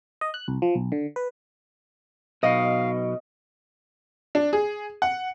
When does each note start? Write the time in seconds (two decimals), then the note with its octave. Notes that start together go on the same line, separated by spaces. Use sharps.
0.21 D#5
0.34 F#6
0.48 C2
0.62 F3
0.75 B1
0.92 D3
1.16 B4
2.43 B1 B2 D#5 F5
4.35 D4
4.53 G#4
5.02 F#5